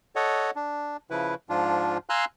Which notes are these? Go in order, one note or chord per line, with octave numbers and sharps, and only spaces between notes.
A4 C#5 D#5 F#5
D4
C#3 F3 E4 B4
G#2 F3 D4 F4
F5 G#5 A#5 C6 E6 F#6